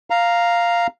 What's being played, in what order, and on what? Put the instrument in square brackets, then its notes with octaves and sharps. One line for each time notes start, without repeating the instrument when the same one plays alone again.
[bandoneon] F5 A#5